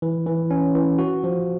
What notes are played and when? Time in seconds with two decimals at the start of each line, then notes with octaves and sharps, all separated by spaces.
0.02 E3
0.26 E3
0.51 C#4
0.75 E3
0.98 F#4
1.24 F3